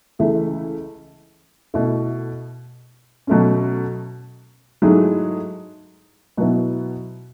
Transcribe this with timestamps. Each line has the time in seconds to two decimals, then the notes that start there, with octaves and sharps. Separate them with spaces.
0.19 C#2 C#3 E3 A3 E4
1.74 B2 A3 E4
3.27 B2 F#3 A3 C#4
4.82 G#2 F#3 A3 E4 G#4
6.37 B2 F#3 B3 E4